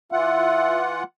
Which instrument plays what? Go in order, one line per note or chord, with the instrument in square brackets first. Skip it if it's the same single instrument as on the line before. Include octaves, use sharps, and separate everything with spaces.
[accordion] E3 F4 F#5 [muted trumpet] E5